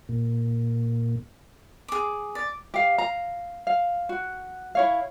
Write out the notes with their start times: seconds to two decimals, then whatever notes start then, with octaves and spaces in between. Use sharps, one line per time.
0.09 A#2
1.88 G#4 D6
2.35 D5
2.74 G4 F5
2.98 F5 A#5
3.67 F5
4.09 F#4
4.75 E4 C#5 F5